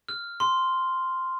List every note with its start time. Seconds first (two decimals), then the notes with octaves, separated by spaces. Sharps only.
0.09 F6
0.40 C6